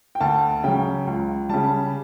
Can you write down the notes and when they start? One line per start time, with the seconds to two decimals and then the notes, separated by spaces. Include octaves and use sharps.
0.15 G5
0.21 D2 A5
0.64 C#3 F#3 G5
1.07 C#2
1.49 C#3 G3 A5